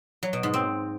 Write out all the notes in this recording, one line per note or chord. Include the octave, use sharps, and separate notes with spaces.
F#3
B2
G#2
C4